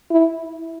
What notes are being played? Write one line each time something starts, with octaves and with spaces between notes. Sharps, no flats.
E4